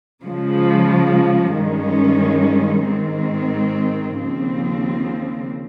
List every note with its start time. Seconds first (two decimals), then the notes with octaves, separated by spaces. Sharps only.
0.23 C#3 F3 G#3
1.54 G2 D#3 G#3 C#4
2.85 G#2 D#3 G#3 C4
4.17 D#2 C#3 F3 C4